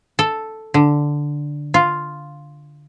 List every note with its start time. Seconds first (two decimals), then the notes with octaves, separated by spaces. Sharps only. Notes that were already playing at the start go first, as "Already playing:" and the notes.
0.19 A4
0.74 D3
1.74 F4